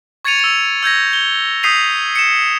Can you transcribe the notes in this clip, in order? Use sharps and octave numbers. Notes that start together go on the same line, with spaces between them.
C#6 G#6 A6 C#7 D#7 F7
E6 F7
E6 G6 G#6 A#6
G7
D#6 G6 B6 C7 D#7 F7
C#7 E7